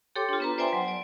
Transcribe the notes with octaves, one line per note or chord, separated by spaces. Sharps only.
G4 A4 C#5 G5 C6 D6
D4 F4
B3 B4 A#5
C5 D5 E5 G5 G#5 C6
F#3
D5